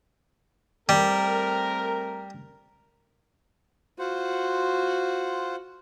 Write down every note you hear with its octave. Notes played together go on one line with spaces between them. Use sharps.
G3 A3 C4 A#4
F4 F#4 C5 F#5